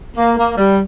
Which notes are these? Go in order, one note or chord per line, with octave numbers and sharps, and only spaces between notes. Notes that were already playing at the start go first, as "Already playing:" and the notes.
A#3
A#3
G3